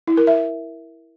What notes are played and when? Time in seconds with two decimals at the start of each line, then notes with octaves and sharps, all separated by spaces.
0.07 E4
0.17 A#4
0.27 E5